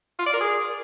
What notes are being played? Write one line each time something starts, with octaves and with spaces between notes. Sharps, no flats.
F4
D5
A#4
G#4